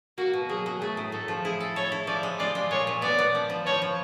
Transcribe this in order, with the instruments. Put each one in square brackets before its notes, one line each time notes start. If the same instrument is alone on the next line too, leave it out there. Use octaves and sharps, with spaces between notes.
[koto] A#3 [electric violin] F#4
[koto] B2
[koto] F#3 [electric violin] G#4
[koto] F#3
[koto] A3 [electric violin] G#4
[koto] A2
[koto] A2 [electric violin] A4
[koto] F3
[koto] E4 [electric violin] G#4
[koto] A4
[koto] A4 [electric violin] C#5
[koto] E4
[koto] F3 [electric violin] D5
[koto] G#3
[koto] F4 [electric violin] D5
[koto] G#3
[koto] A#2 [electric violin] C#5
[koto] A#2
[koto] B3 [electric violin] D5
[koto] B3
F3
F3
[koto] F3 [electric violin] C#5
[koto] F3